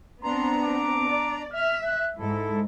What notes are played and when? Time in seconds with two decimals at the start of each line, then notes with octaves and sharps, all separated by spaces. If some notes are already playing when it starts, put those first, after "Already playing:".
0.24 B3 C4 D4 A#5 C6
0.65 D6
1.08 D5
1.53 E5 F6
1.85 F#6
2.19 G#2 E4 A4